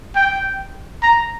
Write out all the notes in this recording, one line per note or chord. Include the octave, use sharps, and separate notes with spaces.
G5
A#5